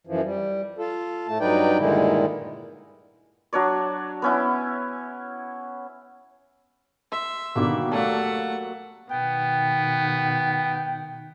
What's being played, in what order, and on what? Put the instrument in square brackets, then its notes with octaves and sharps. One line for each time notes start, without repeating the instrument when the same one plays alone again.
[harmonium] F#2 E3 F3
G3
F4 A4
A2 A3 A5
G2 F#3 D#4 B4 D5 G5
G2 A#2 D3 D#3 G#3 E4
[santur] F#3 D4 C#5 D5
B3 C#4 E4
[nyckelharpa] E5 [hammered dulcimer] C6
[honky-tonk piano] B2 D3 D#3 [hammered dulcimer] G3 A#3 B5
[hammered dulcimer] F#3 [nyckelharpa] A3 F#5 [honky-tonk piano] D5 F5 A5
[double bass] B2 D#3 [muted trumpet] B3 [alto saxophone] G5